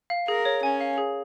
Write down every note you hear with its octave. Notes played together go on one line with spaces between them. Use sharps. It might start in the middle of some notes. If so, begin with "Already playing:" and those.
F5
G#4 A#4
C#5
C#4 G#5
F5
G#4